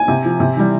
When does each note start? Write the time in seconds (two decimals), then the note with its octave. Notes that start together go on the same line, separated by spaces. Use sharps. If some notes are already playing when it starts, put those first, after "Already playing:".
Already playing: G#5
0.08 C3
0.25 F3
0.40 C3
0.57 E3 G3